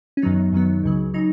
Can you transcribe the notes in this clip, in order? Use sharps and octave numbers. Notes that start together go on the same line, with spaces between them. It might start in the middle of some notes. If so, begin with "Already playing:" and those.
C#4
F#2 D#3 F#3 B3 D#4
F#2 D#3 F#3 B3
C#2 C#3 F#3
C#3 F#3 D#4